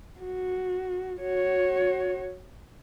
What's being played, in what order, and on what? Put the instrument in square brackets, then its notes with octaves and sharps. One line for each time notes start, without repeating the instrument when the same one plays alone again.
[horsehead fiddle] F#4
F#4 C#5